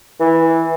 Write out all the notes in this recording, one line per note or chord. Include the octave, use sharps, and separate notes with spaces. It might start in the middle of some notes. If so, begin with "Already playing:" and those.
E3